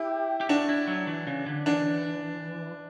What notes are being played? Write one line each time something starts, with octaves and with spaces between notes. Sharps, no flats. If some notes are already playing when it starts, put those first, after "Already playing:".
Already playing: E4 G4
G4
D4 F#4
E4
F#3
E3
C#3
D3
E3 D4